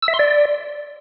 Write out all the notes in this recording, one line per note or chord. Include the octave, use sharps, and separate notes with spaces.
E6
E5
C6
D5